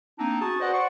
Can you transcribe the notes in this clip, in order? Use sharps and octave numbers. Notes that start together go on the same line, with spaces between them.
A#3 C4 D4 D#4
C#4 F#4 G#4 A5
F#4 B4 C5 D5 D#5 F#5
C5 D5 F#5 C6 C#6